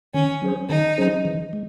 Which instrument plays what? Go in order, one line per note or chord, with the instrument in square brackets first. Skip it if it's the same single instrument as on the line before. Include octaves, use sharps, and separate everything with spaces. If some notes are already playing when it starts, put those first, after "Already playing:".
[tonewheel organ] D#3 [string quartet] C#4
[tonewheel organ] F#3 C#4 G#4 C5
[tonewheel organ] D#3 [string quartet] D#4
[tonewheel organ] F#3 C#4 G#4 C5
E3
G#3